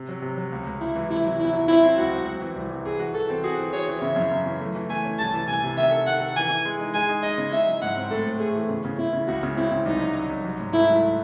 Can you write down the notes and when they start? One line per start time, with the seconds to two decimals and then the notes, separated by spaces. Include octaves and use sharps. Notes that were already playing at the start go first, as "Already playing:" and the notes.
Already playing: C3
0.09 F#3
0.22 C3
0.38 F#3
0.53 C#2
0.67 C#2
0.81 C#2 E4
0.96 E3
1.10 C3 E4
1.25 F#3
1.39 E2 E4
1.54 F#3
1.68 C4 E4
1.83 C4
1.97 C#2 F#4
2.13 C4
2.27 C4
2.41 E3
2.56 C2
2.71 E3
2.85 E3 G#4
2.99 F#4
3.14 E3 A4
3.30 C4
3.44 F#4 G#4
3.58 E3
3.73 G#4 C#5
3.88 E3
4.02 C#3 E5
4.16 F#2
4.31 C#3
4.46 E3
4.60 A3
4.76 E3
4.89 A3 G#5
5.05 C#4
5.19 C2 A5
5.34 E3
5.48 C2 G#5
5.63 C3
5.77 D#3 E5
5.91 A4
6.06 D#3 F#5
6.21 A4
6.36 E3 G#5
6.50 E3
6.65 G#3
6.79 D#4
6.94 G#3 G#5
7.09 D#4
7.23 D#4 D#5
7.38 C#3
7.52 E4 E5
7.67 F#3
7.82 G#2 F#5
7.97 C4
8.11 A2 A4
8.26 A3
8.40 A3 G#4
8.55 E3
8.69 C#3
8.85 C#3
8.98 C#3 E4
9.13 C#3
9.27 C#2 F#4
9.43 C#3
9.56 C4 E4
9.71 C#3
9.86 C2 D#4
10.01 F#3
10.15 F#3
10.29 C2
10.44 F#3
10.59 G#2
10.73 A3 E4
10.88 F#3